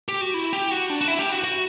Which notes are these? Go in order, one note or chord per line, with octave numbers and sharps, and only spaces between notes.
G4
F#4
E4
G4
F#4
D4
F#4
E4
G4
F#4
F#4